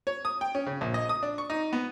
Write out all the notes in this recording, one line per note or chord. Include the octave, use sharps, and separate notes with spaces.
C#5
D#6
G5
C#4
C#3
A#1
D#5
D#6
D4
C#6
D#4
B3